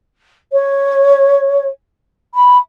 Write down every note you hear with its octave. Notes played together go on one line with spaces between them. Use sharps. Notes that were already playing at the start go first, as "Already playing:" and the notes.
C#5
B5